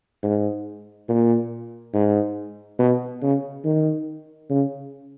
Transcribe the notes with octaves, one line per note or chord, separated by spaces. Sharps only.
G#2
A#2
G#2
B2
C#3
D#3
C#3